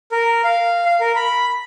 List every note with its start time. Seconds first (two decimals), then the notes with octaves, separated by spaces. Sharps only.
0.12 A#4
0.44 F5
0.86 F5
1.01 A#4
1.16 B5